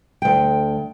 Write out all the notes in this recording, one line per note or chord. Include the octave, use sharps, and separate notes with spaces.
D2 G5